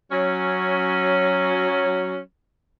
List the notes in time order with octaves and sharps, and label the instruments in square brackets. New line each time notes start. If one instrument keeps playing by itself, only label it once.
[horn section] F#3 C#4